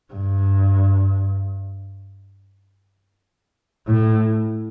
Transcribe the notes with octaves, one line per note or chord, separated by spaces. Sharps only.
G2
A2